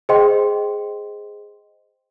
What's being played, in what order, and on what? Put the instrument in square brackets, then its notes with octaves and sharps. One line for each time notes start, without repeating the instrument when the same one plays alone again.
[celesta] G#4 C5 D#5 G5 C6